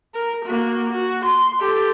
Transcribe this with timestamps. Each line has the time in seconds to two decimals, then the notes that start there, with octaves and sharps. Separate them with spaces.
0.14 A#4
0.46 A#3 F#4
0.92 F#4
1.26 C6
1.60 G4 A4